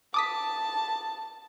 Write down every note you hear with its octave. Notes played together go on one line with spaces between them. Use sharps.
A5 D6 D#6 B6